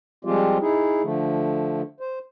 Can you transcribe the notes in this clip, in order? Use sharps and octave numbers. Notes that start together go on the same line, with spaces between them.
F3 G3 G#3 C4 F4 G4
D#4 E4 G#4
D3 F3 A3
C5